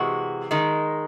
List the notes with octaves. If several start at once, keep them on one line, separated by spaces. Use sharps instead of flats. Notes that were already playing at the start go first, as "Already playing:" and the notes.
Already playing: C3 E3 G#3 F#4
D#3 G#3